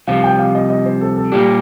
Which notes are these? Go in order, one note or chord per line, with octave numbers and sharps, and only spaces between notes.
C2 C3 F3 F5
G5
F5
D#5
D#5
C5
A4
A4
A#2 G3 A#3 D4 G4